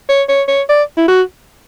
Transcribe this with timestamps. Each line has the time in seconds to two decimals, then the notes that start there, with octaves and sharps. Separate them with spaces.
0.09 C#5
0.29 C#5
0.48 C#5
0.69 D5
0.97 E4
1.08 F#4